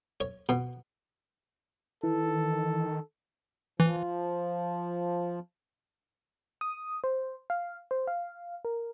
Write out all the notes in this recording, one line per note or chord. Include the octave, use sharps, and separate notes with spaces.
C#5
B2
D#3 E3 A4
E3 F3
D#6
C5
F5
C5
F5
A#4